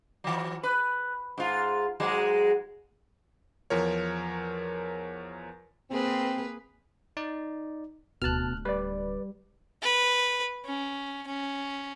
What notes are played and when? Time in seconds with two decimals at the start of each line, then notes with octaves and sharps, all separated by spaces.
0.24 E3 F#3
0.63 B4
1.38 G#2 F4
2.00 G#2 F#3 G#3
3.70 E2 F3 A#4 C#5
5.91 A#3 C4 G#4 B4
7.17 D#4 D5
8.22 D1 D2 B2 A5 F6 F#6
8.65 G3 B4 D5
9.82 B4
10.66 C#4
11.27 C#4